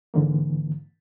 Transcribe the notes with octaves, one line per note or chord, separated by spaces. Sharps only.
G#2 D3 E3 A#3